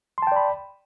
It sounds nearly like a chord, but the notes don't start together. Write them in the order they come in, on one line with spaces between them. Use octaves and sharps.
C6 A5 G5 D5 B5